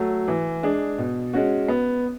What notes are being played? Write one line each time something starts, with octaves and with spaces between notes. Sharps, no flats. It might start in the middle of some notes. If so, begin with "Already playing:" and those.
Already playing: F#3 A3
E3
G#3 D4 G#4
B2
G#3 C#4 F#4
B3